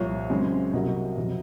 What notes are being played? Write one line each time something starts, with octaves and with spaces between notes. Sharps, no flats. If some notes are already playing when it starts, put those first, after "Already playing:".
Already playing: C2 A#2 F3 C#5
F#2 C#3 G#3 C4
C2 C3 F#3 A#3 D#5
F2 C3 F#3